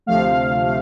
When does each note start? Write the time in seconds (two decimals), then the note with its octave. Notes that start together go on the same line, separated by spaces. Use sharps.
0.06 D2 C3 F3 A3 F5
0.66 A3